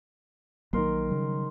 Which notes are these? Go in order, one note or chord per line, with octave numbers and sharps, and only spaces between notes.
A#1 D#3 F#3 A#3 A#4 C6
C#3 F#3 G3